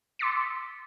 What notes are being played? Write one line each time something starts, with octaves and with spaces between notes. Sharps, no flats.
C6 D6 E6 A6 B6 C#7